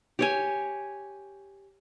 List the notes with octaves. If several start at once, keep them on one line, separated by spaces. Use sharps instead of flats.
G4 C#5 G#5